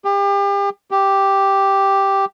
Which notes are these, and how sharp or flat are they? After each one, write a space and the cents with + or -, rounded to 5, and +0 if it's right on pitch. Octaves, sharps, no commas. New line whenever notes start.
G4 +35
G4 +0